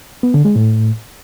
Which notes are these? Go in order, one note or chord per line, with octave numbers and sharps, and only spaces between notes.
B3
D3
G#3
A2